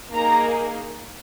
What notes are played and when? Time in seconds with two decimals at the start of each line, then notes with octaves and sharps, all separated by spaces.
0.13 A#3 D#4 G#4 A#5